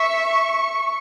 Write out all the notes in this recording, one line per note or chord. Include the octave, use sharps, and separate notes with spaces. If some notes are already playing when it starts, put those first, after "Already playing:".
Already playing: E5 C#6